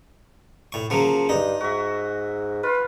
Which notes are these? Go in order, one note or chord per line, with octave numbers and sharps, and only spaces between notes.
A2 C#6
C#3 F3 F#3 A#3
G2 D#4
G#2 F#4 E5
F4 B4